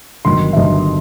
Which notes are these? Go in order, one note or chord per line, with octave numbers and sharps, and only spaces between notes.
G1 G2 D#3 F#3 C6
E5
G1 G2 D#3 F#3 D#5